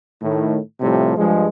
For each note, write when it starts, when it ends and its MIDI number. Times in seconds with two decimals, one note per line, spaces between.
0.22 0.58 45
0.22 0.58 51
0.81 1.14 45
0.81 1.14 48
0.81 1.14 53
0.81 1.14 55
1.17 1.47 43
1.17 1.47 53
1.17 1.47 56